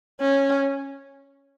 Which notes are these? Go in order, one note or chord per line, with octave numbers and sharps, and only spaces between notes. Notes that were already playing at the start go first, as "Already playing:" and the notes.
C#4